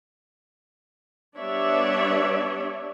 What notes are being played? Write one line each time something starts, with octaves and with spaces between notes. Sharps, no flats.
G3 B3 D4 C#5 D5 E5